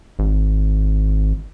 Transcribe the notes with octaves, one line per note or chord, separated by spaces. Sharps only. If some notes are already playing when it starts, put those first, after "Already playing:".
G#1